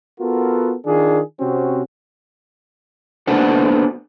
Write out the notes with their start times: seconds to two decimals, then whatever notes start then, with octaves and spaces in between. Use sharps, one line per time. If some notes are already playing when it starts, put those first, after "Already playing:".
0.20 B3 F4 F#4 A4 A#4
0.86 D#3 D4 F4 G#4
1.40 C3 C4 C#4 F#4
3.27 A#3 B3 D4 F#4 A4 C5